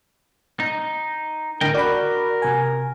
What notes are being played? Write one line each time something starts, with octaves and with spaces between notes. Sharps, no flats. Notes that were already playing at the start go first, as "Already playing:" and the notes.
D#4
A2 D3 A#4 D#5 G5
F#4 A#4 D5 B5
C3 G#5